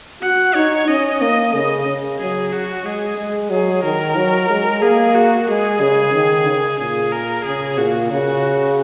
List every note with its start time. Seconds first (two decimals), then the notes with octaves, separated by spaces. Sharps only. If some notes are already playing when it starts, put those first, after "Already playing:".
0.22 F#4 F#5
0.55 D#4 C#5
0.88 C#4 D#5
1.20 A#3 D#5
1.53 C#3 D#5
1.87 C#3
2.19 F#3 G#4
2.52 F#4
2.85 G#3 G#4
3.18 G#3
3.50 F#3 G#4
3.83 D#3 A#4
4.16 F#3
4.49 G#3
4.82 A#3 G#4
5.15 F#4
5.48 G#3 G#4
5.80 C#3
6.13 D#3
6.46 C#3
6.79 A#2 G#4
7.12 A#4
7.45 C#3 G#4
7.78 A#2 F#4
8.11 C#3 F#4